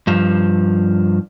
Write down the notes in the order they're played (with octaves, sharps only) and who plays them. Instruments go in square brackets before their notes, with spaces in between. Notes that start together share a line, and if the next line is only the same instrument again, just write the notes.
[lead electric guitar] G2 F3